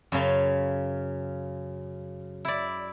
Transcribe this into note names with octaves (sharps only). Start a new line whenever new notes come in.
F#2 C#3
E4 D5